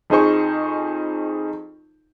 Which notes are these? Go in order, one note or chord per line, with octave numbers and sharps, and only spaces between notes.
F2 D#4 G#4 C5 C#6